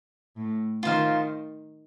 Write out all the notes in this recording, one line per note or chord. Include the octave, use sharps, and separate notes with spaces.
A2
D#3 F4 C5 F5